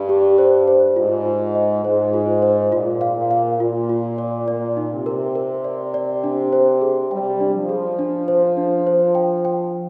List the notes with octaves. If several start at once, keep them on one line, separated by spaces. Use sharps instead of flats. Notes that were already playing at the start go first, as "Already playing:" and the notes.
Already playing: G2 D4
G4
C5
C5
G#2 F4
F4
D#5
G#2 C5
F4
C5
A#2 F4
F5
A#2
F5
A#2 F4
F4
D5
A#2 D5
D#4
C3
A#4
A#4
D5
D5
D4
C5
G#4
G3 G5
D4
F3
G#4
D4
C5
D4
C5
G5
G5